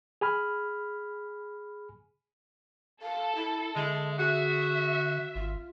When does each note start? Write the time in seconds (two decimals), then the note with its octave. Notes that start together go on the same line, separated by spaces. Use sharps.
0.21 G#4 G#5 B5 F6
3.02 A4 F5
3.35 E4
3.76 D3 G#3 E5
4.18 F#4 G#4 E5
5.35 G#1 F4